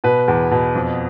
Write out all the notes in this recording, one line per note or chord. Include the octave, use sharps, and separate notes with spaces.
B2 B4
E2
B2
F2